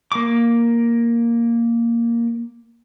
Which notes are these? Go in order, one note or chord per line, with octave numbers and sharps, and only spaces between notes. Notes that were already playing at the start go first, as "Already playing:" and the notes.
A#3 D6